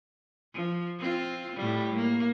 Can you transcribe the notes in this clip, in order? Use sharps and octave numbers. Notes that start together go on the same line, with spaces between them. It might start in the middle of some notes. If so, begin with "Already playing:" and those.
F3
C4 F4
A2 G3
A#3